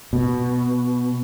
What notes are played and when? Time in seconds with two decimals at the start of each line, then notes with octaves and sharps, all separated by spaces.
0.13 B2